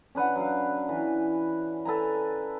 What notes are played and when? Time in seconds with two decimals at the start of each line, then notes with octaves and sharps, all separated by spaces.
0.15 C#4 D4 B4 F#5
0.36 F#3 F5
0.89 E3
1.85 A4 B4 G#5 A#5